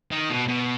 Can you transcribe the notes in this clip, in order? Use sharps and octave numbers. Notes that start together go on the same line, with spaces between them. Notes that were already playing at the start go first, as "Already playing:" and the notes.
D#3
B2
B2